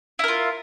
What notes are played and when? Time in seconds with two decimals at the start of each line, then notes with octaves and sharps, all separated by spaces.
0.19 E4
0.24 A#4
0.28 F4